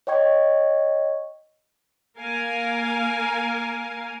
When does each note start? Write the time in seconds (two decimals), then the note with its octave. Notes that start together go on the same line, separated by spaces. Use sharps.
0.07 C#5 D#5 G5 C#6 G#6
2.17 A#3 A#4 F5 G#5